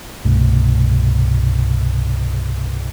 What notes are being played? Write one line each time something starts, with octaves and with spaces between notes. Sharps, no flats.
C2 G2 B2 A3